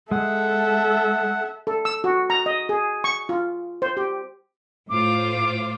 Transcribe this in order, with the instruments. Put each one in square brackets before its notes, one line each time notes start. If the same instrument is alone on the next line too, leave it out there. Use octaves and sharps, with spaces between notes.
[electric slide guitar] G#3 [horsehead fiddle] A4 E5 [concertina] F#5
[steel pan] A4
E6
F#4
A#5
D#5
G#4
C#6
F4
C5
G4
[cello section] A2 F4 C5 [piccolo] D6